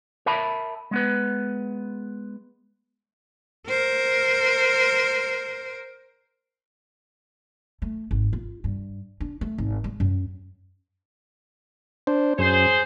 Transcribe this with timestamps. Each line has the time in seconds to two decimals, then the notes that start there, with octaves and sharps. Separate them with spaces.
0.26 A#4 E5 A5 B5
0.91 G#3 B3 B4
3.68 A#4 C5
7.82 A3
8.11 G#1
8.33 F4
8.64 G2
9.20 D4
9.41 A3
9.58 G#1
9.84 G#3
10.00 F#2
12.07 D4 C5
12.38 F#2 G#4 C5